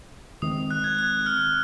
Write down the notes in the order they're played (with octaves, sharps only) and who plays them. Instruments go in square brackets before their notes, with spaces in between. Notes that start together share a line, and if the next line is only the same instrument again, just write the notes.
[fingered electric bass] D#3 G#3 C4 [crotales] D#6
[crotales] F#6
G#6
F#6
F6